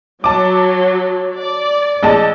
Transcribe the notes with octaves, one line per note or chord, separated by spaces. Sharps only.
F#3 A5 D6
D5
A1 G#3 A5